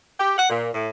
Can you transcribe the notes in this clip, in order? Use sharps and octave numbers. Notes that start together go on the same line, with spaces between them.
G4
F#5
A#2
A2